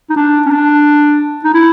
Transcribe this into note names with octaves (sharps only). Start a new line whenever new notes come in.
D#4
D4
C#4
D4
D#4
E4